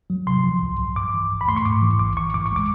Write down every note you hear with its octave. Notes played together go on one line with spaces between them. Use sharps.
F#3
C3 C6
F3
C2
C2
G2 D6
E3
G1
B5
A3 C6
C#6
G#2 D6
E3
A1 D6
A1 C#6
E3 D6
C#6
G#3 D6